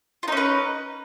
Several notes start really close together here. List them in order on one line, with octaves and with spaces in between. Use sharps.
F4 D#4 C#4 B4